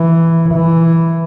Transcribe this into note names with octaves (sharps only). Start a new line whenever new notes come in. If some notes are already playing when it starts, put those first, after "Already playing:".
Already playing: E3
E3